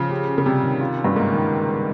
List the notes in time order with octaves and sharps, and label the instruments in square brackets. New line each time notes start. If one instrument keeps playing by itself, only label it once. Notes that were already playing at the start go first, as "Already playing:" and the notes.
Already playing: [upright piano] C#3 [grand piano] F3
[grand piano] G4
C#4
[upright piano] C#3
[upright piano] C3 [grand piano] G3
[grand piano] D#3
F4
C#4
[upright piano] G2
[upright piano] G#2 [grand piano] A#3
[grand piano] D#3